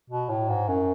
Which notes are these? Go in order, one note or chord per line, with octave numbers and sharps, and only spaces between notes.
B2
A2
G#2
F#2